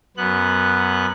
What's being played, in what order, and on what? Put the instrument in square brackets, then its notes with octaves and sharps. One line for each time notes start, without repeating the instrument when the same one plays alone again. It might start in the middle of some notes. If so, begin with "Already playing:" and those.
[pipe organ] F#2 B3 F#6